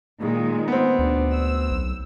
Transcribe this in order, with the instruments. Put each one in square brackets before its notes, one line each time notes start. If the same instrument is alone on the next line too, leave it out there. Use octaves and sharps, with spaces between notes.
[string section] A#2 D#3 G#3
[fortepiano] B3 C4
[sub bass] D2 [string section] D4
[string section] E6
[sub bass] B1